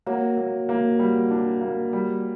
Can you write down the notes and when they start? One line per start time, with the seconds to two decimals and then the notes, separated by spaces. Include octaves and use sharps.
0.06 F#3 A#3 F#4
0.37 A#3
0.69 A#3
0.99 G3
1.31 D4
1.61 A#3
1.93 G3